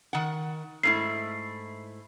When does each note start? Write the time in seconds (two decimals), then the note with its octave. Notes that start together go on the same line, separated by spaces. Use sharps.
0.13 D#3 F#5
0.83 G#2 A3 E4 C7